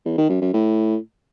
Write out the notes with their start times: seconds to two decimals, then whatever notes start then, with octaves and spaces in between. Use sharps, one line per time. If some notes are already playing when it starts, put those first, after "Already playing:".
0.06 E2
0.18 D#3
0.30 F#2
0.42 F#2
0.54 A2